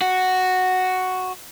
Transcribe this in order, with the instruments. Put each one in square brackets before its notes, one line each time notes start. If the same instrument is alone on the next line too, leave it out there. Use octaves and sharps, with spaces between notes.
[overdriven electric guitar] F#4